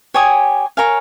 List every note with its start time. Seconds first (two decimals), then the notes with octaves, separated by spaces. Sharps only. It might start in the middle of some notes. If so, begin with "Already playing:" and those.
0.14 G4 C#5 G#5 D#6
0.77 A#4 C#5 F5 G#5